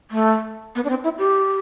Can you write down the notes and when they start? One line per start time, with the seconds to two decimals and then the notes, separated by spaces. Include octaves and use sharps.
0.11 A3
0.75 B3
0.85 D4
0.90 C4
1.04 E4
1.18 G4